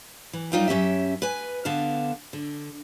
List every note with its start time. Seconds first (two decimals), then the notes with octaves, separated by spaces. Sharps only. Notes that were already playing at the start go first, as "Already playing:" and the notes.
0.33 E3
0.52 F#2 G3 D#4 F4 A#4 G5
0.68 F#2 C#4 G4 E5
1.22 B4 G#5
1.65 D3 B3 F5 A5
2.33 D3